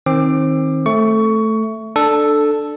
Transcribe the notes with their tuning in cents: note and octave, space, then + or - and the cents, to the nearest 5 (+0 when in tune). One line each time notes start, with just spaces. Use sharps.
D#3 +15 C4 +25 D6 +15
A3 +0 C#6 +20
D4 +15 A4 +0